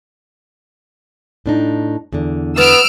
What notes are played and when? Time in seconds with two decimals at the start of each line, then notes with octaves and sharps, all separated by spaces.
1.46 A2 D4 D#4
2.13 E2 D3
2.58 B3 E6 F6 D7